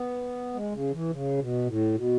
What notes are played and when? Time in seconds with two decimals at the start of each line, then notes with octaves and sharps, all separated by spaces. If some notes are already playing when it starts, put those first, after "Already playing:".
Already playing: B3
0.54 G#3
0.72 C#3
0.92 E3
1.10 C#3
1.38 B2
1.66 A2
1.94 B2